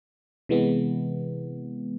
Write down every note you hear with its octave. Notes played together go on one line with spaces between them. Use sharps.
C3 E3 G#3 B3